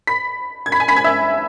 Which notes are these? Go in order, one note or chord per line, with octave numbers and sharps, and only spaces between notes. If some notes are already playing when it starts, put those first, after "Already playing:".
B5 B6
G#6
B5 B6
G#5 G#6
B5 B6
G#5 G#6
E5 E6